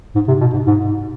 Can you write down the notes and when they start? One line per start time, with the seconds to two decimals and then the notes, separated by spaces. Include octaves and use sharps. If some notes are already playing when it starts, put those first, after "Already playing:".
0.15 G#2
0.28 C3
0.41 B2
0.54 G#2
0.66 G#2